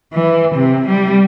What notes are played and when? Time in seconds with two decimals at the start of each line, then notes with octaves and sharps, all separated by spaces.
0.13 E3
0.56 C3
0.88 G3